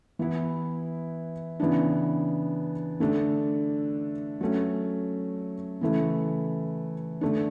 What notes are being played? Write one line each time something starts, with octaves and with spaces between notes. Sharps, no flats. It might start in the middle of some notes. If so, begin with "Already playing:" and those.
E3 B3 E4
C#3 E3 B3 D4
D3 A3 D4
F#3 A3 C#4
C#3 E3 A3
D3 A3 D4